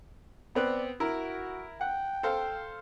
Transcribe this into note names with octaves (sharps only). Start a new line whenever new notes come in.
B3 C4 B4 D5
E4 F#4 A#4
F#5 G5
A4 C5 F5